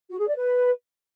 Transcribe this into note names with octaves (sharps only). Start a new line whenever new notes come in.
F#4
G#4
D5
B4